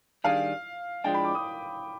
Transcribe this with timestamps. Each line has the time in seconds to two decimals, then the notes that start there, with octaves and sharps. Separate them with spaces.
0.24 D#3 G3 D4 G#4 F5
1.04 F3 G#3 D4 G5
1.14 B5
1.24 D6
1.35 D#6